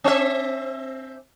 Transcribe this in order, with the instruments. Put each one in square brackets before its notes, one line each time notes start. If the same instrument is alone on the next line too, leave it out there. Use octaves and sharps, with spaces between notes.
[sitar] C4 E5